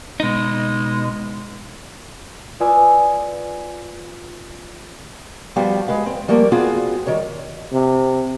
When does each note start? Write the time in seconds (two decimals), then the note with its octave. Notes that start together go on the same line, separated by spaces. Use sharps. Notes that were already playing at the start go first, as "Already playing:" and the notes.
0.20 B2 G#3 D#4
2.60 F4 B4 D5 G#5 D#6 E6
5.56 F3 G3 B3 F#4 G4 F5
5.88 G#3 B4 F5
6.06 C4
6.28 F3 G3 A3 A#3
6.52 B3 C4 F4 F#4 G#4
7.06 D#3 G3 C#5
7.73 C3